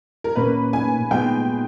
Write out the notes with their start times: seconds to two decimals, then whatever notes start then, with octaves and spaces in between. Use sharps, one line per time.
0.24 A#4
0.36 A#2 A#3 C#4 B4
0.73 G#5
1.11 A#2 G#3 B3 G5